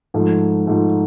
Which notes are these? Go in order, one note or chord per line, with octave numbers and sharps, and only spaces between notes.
G#2 F3 A3
G#2 F3 A3